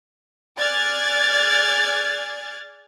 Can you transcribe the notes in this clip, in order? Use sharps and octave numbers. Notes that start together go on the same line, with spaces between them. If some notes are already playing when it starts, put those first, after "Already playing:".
G#4 D5 F6 F#6 G#6 A6